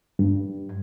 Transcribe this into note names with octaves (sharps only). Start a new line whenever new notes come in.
G2